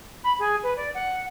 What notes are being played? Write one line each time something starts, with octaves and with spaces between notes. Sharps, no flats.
B5
G#4
B4
D5
F#5